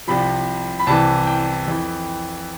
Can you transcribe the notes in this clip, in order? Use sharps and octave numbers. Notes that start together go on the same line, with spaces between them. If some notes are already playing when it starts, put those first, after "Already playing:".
C2 C3 F3 B5
B5
C2 C3 E3 A5
G5
F2 E3